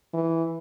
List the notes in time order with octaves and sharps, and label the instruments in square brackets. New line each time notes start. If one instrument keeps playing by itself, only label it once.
[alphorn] E3